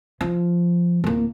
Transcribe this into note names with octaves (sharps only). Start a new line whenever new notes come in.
F3
D1 A#3